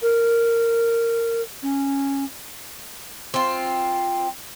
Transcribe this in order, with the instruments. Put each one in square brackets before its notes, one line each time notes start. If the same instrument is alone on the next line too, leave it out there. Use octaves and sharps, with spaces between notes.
[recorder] A#4
C#4
[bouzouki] C4 F4